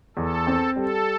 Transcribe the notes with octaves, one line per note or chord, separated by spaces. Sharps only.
E2 A4
C4
G3 A4